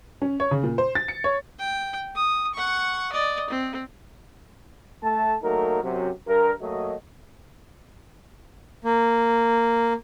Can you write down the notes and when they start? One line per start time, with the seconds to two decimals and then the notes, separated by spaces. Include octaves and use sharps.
0.22 C#4
0.40 C#5
0.51 C#3
0.64 A#2
0.78 C5
0.95 A6
1.08 C#7
1.24 C#5
1.59 G5
2.15 D#6
2.54 F#5 C#6
3.12 D5 D#5
3.50 C4
5.03 A3 A5
5.43 F#3 A3 A#3 D#4 F#4 A#4
5.82 F#2 C3 F#3
6.26 G2 A#4
6.61 F#3 A3 A#3 F#4 D#5
8.84 A#3